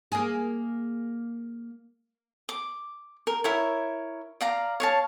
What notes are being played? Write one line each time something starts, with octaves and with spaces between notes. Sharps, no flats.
A#3 G#4
D6
A#4
E4 A#4 C#5
D5 F5 A#5
C#5 F5 A5